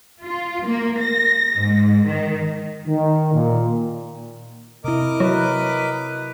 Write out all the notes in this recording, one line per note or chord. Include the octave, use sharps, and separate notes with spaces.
F4
A#3
A#6
G#2
D#3
D#3
A#2
C3 E4 A#4 D#5 D6
F#3 B4